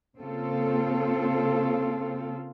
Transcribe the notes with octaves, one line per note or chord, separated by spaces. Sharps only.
C#3 A#3 C4 F4 A4